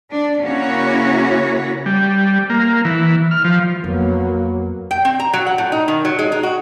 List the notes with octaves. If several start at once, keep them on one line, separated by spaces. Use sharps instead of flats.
D4
C#3 A#3 C#4 E4 F#4 C#5
G3
A#3
E3
F6
F3
F2 F#3 A#3 B3
G5
C4
A#5
F#3
F#5
A2
D#4
D#3
F#3
G#3
D#4
F#4